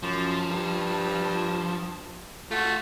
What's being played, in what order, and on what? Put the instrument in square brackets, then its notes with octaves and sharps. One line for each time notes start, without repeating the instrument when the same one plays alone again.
[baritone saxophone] F#2 [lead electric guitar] F3
[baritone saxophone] G2
[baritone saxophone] A3 [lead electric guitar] F4 F#4